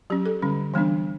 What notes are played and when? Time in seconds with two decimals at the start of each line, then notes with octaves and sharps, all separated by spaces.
0.10 F#3 C#4 G4
0.26 A4
0.42 D3 G3 C#4
0.74 E3 G3 B3 D4